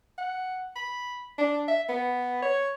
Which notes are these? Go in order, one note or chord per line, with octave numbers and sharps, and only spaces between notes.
F#5
B5
D4
E5
B3
C#5